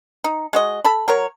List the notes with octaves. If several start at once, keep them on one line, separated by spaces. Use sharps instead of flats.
D#4
G#3 F#4 D#5
A4 A5 B5
F#3 A#4 C#5